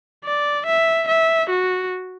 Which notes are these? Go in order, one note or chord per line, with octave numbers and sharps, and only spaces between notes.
D5
E5
E5
F#4